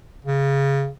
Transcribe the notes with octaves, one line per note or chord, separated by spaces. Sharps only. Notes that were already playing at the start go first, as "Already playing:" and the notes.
C#3